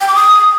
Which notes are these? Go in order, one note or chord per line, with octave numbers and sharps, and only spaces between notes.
G5
D6
D#6